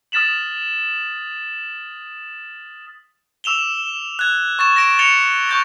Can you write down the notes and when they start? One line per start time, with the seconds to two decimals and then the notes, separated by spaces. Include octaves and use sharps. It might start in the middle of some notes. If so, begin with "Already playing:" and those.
0.12 D#6 F6 A6 B6 E7 F#7
3.44 D6 E6 E7 F7 G7
4.19 F#6 G#6
4.59 C#6 A6 E7
4.76 A#6 D7 E7
4.99 A6 C#7 F7 G7
5.49 C#6 G6 A6